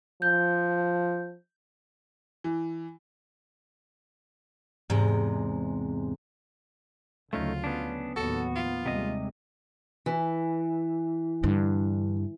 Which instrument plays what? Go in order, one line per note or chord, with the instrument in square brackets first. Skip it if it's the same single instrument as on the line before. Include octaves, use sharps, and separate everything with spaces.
[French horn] F3 [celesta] G6
[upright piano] E3
[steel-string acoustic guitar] E2 G#2 C3 G#3
[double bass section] D2 C#3 F#3 [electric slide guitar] A3 C#4 D#4 [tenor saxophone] F4
[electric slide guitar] B3 C#4 D4
[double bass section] D#2 A2 F#3 [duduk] B3 [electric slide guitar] F#4 [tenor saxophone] A4
[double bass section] F3 [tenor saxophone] F4
[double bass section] D#2 G3 G#3 [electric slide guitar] C3 D#5
[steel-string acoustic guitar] E3
[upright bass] G2 D3